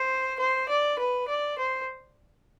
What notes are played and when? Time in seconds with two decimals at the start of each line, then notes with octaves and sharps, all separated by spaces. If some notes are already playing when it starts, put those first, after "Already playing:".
Already playing: C5
0.39 C5
0.69 D5
0.99 B4
1.28 D5
1.58 C5